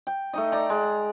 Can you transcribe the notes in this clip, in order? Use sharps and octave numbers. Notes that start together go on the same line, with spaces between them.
G5
A3 D#4 D#5
D5 A#5
G#3